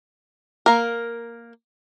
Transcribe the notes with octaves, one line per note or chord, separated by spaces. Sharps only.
A#3 A#4